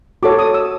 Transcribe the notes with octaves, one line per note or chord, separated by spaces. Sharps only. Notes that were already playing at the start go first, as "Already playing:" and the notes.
F#4 A4 C#5 D6
D#6
E6